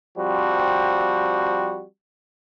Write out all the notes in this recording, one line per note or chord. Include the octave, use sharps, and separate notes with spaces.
F3 G3 C4 F#4